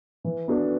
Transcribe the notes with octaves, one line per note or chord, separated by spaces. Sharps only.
E3
B3 D4 F#4 A4